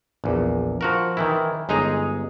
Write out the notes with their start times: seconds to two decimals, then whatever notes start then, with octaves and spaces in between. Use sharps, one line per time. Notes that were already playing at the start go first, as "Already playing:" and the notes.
0.24 A#1 E2
0.81 F3 F#4 A#4
1.17 D#3 E3 E4
1.69 G1 G#3 D#4 G#4 A#5